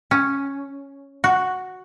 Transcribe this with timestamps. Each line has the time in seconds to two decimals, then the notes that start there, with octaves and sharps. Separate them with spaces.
0.11 C#4
1.24 F#4